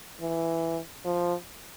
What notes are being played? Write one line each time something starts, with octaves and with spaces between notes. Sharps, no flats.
E3
F3